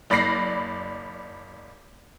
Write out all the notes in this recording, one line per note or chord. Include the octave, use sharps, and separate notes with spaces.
F#1 D5 B5 A#6 C7